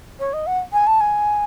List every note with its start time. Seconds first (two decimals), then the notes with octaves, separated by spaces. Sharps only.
0.20 C#5
0.33 D#5
0.47 F#5
0.73 G#5
0.87 A5
1.01 G#5